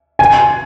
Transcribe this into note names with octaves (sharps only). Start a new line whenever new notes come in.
G#5